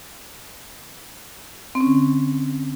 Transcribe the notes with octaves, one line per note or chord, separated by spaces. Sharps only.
C4
C#4
D3